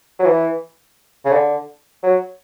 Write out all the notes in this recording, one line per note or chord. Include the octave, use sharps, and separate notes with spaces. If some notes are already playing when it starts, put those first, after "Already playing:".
F#3
E3
C#3
D3
F#3